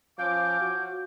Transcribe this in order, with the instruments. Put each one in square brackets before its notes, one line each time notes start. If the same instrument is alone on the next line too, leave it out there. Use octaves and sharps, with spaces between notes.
[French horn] F3 [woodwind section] C#4 F5 D6 [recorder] G6
[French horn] F#4